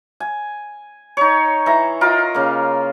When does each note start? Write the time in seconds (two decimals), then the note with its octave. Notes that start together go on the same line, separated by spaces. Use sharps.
0.20 G#5
1.17 D#4 C#5
1.66 E3 E5 A#5
2.01 F4 A#4 D#5 F5
2.34 C#3 A#3